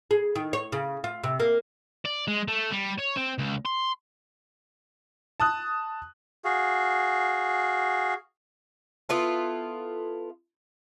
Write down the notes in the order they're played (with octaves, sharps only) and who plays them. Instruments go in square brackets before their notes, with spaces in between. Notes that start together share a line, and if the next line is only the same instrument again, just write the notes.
[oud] G#4
D#3
C#5
C#3
F4
C3
A#3
[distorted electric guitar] D5
G#3
A3
G3
C#5
C4
C#2
C6
[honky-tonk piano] A5 D#6 F#6
[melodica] F#4 G#4 F5
[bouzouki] B3 E4 F4 A4